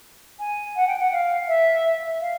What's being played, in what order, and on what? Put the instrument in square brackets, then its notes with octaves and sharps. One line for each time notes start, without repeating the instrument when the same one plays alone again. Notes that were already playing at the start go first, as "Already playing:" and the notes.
[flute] G#5
F#5
G5
F#5
F5
E5
F5